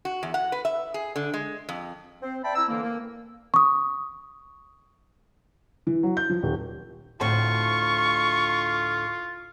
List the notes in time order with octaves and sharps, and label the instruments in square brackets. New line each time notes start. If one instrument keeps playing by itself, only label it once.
[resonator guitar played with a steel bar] F#4
E2
F#5
B4
E5
G#4
D3
G#3
F2
[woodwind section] C4 C5
C4 D5 E5 G5 A5 B5
C4 E4 A#5 E6
D3 E3 A#3
A#3
[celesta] C#6 D#6
[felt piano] E3
F#3
G6
F3
D#1
[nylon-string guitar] D2 A2 C4 [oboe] F4 [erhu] C#6